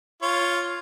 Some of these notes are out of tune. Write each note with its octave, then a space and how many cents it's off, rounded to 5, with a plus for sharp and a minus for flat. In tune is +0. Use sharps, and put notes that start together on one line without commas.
F4 +0 C#5 +0